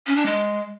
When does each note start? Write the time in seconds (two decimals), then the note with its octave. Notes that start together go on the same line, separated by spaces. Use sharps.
0.07 C#4
0.16 D4
0.26 G#3